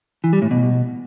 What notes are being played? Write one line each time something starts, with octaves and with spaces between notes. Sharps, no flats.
E3
G3
A2
B2